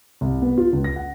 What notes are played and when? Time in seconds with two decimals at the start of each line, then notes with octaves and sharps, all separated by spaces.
0.21 C2
0.42 B3
0.58 F4
0.73 C#2
0.84 A#6
0.96 F#5